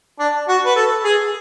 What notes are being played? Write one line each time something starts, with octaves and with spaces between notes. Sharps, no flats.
D4
F#4
B4
A4
G#4